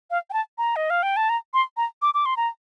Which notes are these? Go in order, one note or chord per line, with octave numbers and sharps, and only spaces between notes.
F5
G5
A5
A#5
D#5
F5
G5
A5
A#5
C6
A#5
D6
D6
C6
A#5